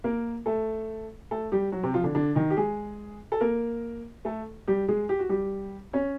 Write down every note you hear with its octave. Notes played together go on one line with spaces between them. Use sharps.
A#3 A#4
A3 A4
A3 A4
G3 G4
F#3 F#4
C3 C4
F3 F4
D3 D4
D3 D4
D#3 D#4
G4
G#3 G#4
A4
A#3 A#4
A3 A4
G3 G4
G#3 G#4
G4
F#4
G3 G4
C#4 C#5